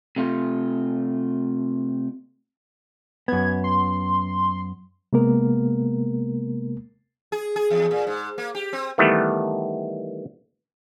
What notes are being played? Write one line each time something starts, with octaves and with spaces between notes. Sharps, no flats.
C3 A3 F4
F#2 B3 G#6
C6
C3 G#3 A#3 B3 A#4
G#4
G#4
E2
A#2
G#2
A#3
G4
C4
D#3 E3 G3 A3 B3